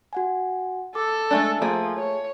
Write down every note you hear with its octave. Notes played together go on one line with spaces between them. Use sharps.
F#4 F#5 G#5
A4 D6
G#3 A3 D4 E5 G#5 A5
F3 A3 A#3 G#4
C#5